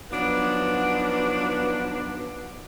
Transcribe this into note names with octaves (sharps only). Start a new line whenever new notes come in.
F3 F#3 B3 D4 D#4 B4